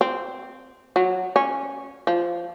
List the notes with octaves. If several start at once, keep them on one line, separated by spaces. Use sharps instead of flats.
C4
F#3
C#4
F3